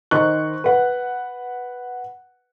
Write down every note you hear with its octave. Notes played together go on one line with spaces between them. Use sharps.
D#3 D#4 C5 C#6 F#6
B4 F#5